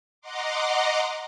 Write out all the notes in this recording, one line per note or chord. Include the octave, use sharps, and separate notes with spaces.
D#5 F#5 A#5 C6 D6